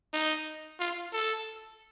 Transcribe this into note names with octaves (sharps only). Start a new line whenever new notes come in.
D#4
F4
A4